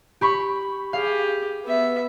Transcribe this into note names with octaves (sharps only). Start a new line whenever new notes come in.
G4 B5 C#6
G4 G#4 F5
B3 E5